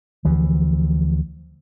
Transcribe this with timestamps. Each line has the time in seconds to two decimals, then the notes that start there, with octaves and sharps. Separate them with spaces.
0.25 D2 E3 F3